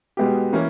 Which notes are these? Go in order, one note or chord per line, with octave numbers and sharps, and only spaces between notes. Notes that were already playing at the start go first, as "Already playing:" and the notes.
B2 G#3 B3 G4
E3 A#3 C#4 E4